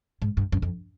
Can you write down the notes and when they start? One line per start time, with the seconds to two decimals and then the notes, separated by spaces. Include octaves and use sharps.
0.22 G#2
0.37 G2
0.52 F#2
0.62 F2